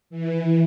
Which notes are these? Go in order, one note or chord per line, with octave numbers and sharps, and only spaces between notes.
E3